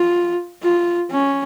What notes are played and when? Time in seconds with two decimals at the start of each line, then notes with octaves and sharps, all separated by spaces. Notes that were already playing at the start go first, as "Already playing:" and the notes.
Already playing: F4
0.63 F4
1.11 C#4